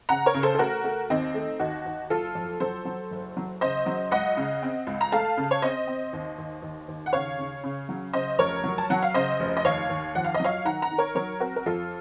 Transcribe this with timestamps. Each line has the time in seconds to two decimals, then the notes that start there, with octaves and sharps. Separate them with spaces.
0.09 C#3 F#5 A#5
0.26 A#4 C#5
0.34 C#3
0.43 A4 C5
0.55 A4
0.59 A3 F#4 A#4
0.84 A3
1.10 D#2 C4 D#4
1.34 A3
1.60 D#2 D#4 F#4
1.86 D#2
2.10 F#1 F4 A4
2.35 F2
2.60 F#3 A4 C5
2.85 F#3
3.11 F#1
3.37 F#3
3.61 C#3 C5 D#5
3.86 F#3
4.11 C#2 D#5 F#5
4.37 C#3
4.62 C4
4.87 C#2
5.01 A#5
5.12 A3 F5 A5
5.37 C#3
5.51 C#5
5.62 C4 C5 D#5
5.87 C4
6.13 D#2
6.38 D#2
6.62 D#2
6.88 D#2
7.06 F#5
7.13 C#3 C#5 F5
7.39 C#3
7.64 C#3
7.89 F#3
8.13 C#3 C5 D#5
8.39 F1 A#4 C#5
8.64 F#3
8.78 A5
8.90 F#3 F#5
9.03 F5
9.14 C#3 C5 D#5
9.40 F1
9.57 D#5
9.64 D#2 C#5 F5
9.89 D#2
10.15 F2 F#5
10.24 F5
10.34 D#5
10.40 F#3 C#5 F5
10.65 D#3 F#5 A#5
10.82 F#5 A#5
10.91 D#3
10.98 A#4 C#5
11.15 F#3 A#4 C#5
11.40 C4 F#4 A#4
11.56 A#4
11.66 F2 F4 A4